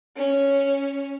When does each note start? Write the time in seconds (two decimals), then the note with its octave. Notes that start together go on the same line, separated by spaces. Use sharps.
0.16 C#4